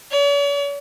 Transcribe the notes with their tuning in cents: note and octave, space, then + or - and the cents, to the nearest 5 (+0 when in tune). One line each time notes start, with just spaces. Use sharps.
C#5 +45